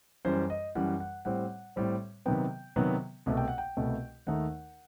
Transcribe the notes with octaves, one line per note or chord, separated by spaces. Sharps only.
F#2 E3 G3 C5
D#5
F#2 E3 G3 F#5
F#5
A2 G3 C4 F#5
A2 G3 C4
C3 D#3 F#3 B3 G5
C3 D#3 F#3 B3
C2 B2 A3
G5
F#5
G5
C2 B2 A3
D#2 D#3 A3 D#4 F#5